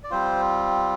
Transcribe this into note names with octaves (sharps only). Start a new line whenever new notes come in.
D5
G3 C4 F4 C5